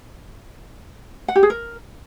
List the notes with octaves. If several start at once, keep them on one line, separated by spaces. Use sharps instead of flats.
F#5
G4
G#4
A#4